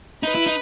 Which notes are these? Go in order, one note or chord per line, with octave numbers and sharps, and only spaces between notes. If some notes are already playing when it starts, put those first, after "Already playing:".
D#4 B4
E4
D#4